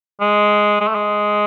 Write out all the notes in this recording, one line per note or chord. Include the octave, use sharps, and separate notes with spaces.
G#3
G#3
A3
G#3